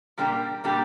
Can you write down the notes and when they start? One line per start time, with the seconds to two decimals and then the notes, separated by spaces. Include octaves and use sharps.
0.18 A#2 G3 A#3 D4 G4
0.64 A#2 G3 A#3 D4 G4